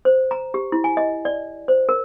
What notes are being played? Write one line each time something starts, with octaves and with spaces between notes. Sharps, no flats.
C5
A#5
G4
E4
G#5
D#5
D5
C5
A#4